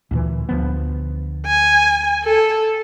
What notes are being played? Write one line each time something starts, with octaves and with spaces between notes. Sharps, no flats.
D2 A#2 E3
D2 F3 B3
G#5
A4